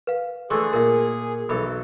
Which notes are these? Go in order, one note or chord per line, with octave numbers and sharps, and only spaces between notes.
B4 F5
D3 E3 A3 G#4 C6 C#6
A#2 A#4 E5
B1 E3 A4 B5